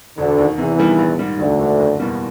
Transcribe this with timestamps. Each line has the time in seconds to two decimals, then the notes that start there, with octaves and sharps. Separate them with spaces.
0.18 E1 D2 D3
0.38 D#2 D#3
0.58 E2 C3 E3
0.78 D#3 G3 B3 E4
0.99 A#1
1.19 G#2 D#3 G3
1.39 E1 D2 D3
1.59 D#2 D#3
1.79 F#1
2.00 E2 B2 G3 A#3